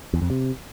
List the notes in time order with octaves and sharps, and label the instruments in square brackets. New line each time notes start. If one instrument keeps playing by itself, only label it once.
[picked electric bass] E2
F2
C3